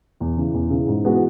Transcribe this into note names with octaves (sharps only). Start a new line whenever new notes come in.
E2
C#3 E3
E2
C#3 E3
G#2
E3 G#3 B3 F#4